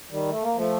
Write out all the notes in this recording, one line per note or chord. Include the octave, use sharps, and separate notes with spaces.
D#3 G3
A3
A#3
F3 A3